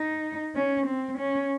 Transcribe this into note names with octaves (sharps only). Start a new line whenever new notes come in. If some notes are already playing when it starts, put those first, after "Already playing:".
Already playing: D#4
C#4
C4
C#4